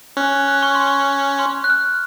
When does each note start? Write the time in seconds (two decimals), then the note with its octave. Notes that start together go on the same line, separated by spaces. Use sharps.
0.17 C#4 F#6
0.32 F#6
0.48 F#6
0.63 C#6
0.75 C6
0.87 C#6
1.39 C6
1.64 F#6
1.70 F6